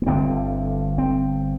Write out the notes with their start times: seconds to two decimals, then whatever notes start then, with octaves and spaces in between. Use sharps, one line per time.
0.02 A#3
0.06 G1 G2 D3 C4
0.98 C4